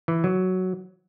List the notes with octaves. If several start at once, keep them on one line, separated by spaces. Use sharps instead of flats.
E3
F#3